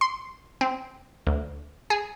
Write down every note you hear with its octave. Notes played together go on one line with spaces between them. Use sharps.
C6
C4
D2
G#4